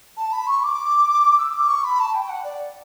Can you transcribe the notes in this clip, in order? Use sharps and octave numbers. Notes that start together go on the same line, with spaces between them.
A5
B5
C#6
D6
E6
D6
C#6
B5
A5
G5
F#5
D5